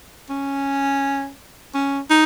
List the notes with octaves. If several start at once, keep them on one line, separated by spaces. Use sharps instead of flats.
C#4
C#4
D#4